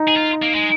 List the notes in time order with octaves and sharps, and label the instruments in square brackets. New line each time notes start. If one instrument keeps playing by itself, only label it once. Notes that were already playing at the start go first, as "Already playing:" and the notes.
Already playing: [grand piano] D#4
[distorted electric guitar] G#4
F4
A#3
G#3